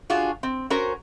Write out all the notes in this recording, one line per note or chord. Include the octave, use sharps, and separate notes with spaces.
D4 F4 F#4 G#4
C4
C#4 F#4 A#4 C5 A#5